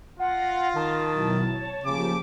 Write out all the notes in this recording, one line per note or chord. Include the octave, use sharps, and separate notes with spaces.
F4 F#5 A#6
D#3 A5
B2 F#3 E4
C#5
C#3 F3 A#3 G4 D6